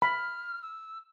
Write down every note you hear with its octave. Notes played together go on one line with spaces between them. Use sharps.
B5 F6
E6